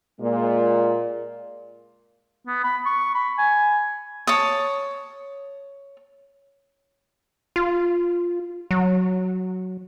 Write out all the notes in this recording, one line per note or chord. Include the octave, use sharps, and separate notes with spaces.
A#2 G#3
B3
B5
C#6
B5
G#5
C#5 A5 D#6
F4
F#3